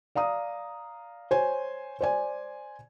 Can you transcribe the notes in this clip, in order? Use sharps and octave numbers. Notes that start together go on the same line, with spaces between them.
D5 F5 A#5 D#6
C5 C#5 G#5
C5 D5 G#5